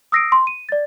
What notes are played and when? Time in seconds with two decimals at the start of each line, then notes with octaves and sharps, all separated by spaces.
0.12 D#6 E6 A#6 C7 D7
0.32 C6
0.47 D#7
0.69 D5 A6